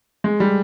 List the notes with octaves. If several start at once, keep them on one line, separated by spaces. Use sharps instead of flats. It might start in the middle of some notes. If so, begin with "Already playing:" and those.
G#3
G3